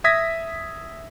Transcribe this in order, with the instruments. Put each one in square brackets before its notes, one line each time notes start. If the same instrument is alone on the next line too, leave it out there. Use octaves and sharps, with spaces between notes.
[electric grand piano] E5 D#6 G#6 A#6 B6